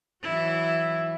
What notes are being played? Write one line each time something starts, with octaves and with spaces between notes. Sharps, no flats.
E3 F#3 E4